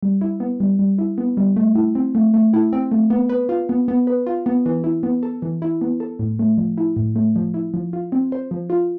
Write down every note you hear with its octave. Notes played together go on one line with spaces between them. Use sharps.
G3
E4
B3
G3
G3
E4
B3
G3
A3
E4
C4
A3
A3
E4
C4
A3
B3
B4
F4
B3
B3
B4
F4
B3
E3
E4
B3
A4
E3
E4
B3
A4
A2
A3
F3
E4
A2
A3
F3
E4
F3
F4
C4
C5
F3
F4